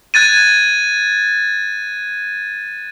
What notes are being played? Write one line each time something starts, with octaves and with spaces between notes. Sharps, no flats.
F#6 G#6 A6 D#7